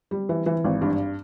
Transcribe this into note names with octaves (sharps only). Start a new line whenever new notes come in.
G3
E3
E3
G#1
G2